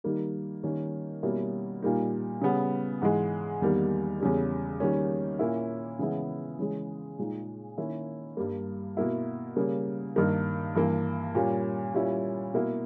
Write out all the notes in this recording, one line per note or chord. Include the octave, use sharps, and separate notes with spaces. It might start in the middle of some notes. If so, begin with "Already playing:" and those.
D#3 G3 A#3 D#4
D#3 G3 A#3 C#4
B2 G3 A#3 C#4 E4
A#2 G3 A#3 D#4
C#3 G3 B3
G#2 E3 G#3
E2 D#3 G3 A#3
E2 C#3 G3
D#3 G3 A#3 C#4
A#2 A#3 C#4 E4
C#3 E3 G#3 B3 E4
C#3 E3 G#3
A#2 G#3 D#4
D#3 A#3 C#4 E4
G2 G3 A#3
B2 A#3 E4
C#3 G3 A#3
G2 D#3 A#3 D#4
G2 E3 A#3
A#2 G3 A#3 C#4
A#2 G3 C#4 E4
B2 A#3 E4